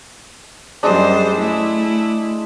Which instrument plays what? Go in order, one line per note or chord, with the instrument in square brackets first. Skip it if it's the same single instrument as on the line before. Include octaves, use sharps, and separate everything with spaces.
[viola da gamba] F#2 G3 C5 [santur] G#3 D4
[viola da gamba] A3 E4